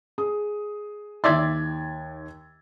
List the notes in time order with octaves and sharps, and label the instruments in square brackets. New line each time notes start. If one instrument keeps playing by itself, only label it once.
[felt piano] G#4 D#6
[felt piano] D#2 G#6 A6 [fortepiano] D5 E5 C6